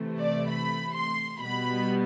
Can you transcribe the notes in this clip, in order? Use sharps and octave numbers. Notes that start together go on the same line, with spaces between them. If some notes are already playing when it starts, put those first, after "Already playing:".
Already playing: C3 E3 A3
D5
B5
C6
B2 G3 B3 B5